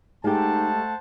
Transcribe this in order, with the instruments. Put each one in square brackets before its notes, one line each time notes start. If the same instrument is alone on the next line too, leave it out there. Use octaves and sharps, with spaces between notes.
[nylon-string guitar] G#3 G4 [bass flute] A3 [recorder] D#4 [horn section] C5 F#5 A5